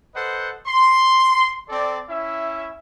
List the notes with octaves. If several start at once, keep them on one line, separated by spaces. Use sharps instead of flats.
A4 B4 C5 D#5 F#5
C6
C4 A4 D5
C#4 E4 E5